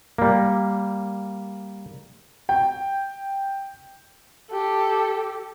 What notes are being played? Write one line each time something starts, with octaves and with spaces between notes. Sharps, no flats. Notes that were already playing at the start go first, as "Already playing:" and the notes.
G3 A#3
G5
G4 A4